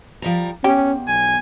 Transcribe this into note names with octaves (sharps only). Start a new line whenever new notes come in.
F3 G3 A#5
E2 C#4 G4
B1 G#5